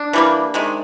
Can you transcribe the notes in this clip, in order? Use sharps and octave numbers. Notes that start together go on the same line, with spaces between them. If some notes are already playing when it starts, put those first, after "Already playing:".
Already playing: D4
E3 G3 A#3
C3 D#3 G#3